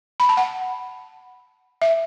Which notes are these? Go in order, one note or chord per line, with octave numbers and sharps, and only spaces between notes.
B5
A5
F#5
E5